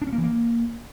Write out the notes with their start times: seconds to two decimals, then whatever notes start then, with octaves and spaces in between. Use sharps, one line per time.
0.02 D4
0.07 C#4
0.13 A#3
0.18 E3
0.23 A#3